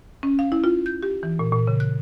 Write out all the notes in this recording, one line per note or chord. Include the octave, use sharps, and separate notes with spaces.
C#4
F5
E4
F4
G6
G4
E3
A#2
A#2
C#3
F#6